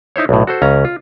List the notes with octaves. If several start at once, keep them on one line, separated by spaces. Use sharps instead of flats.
D#4 E4 C5 C#5
B1 A2
F#4 A4 C5
C#2 C#4 A#5
F4